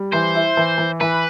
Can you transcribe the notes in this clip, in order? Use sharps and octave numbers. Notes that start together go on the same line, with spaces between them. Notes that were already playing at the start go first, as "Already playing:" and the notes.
Already playing: G3
E3 C5
E4
E3
E3
E3 B4